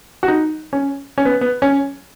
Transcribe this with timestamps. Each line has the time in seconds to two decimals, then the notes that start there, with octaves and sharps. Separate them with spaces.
0.23 F#4
0.28 D#4
0.73 C#4
1.18 C#4
1.25 B3
1.41 B3
1.62 C#4